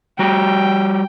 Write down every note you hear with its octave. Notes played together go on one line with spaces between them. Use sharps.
G3 F#4 G4 G5